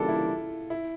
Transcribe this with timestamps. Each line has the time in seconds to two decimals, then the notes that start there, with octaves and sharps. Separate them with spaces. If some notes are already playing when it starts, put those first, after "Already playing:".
Already playing: C#3 E3 G3 A#3 D4 F4 A4
0.08 E4
0.70 E4